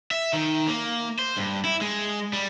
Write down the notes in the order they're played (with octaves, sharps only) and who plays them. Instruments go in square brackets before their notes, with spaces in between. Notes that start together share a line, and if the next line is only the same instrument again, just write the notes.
[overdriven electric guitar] E5
D#3
A#3
C5
G2
E4
G#3
G3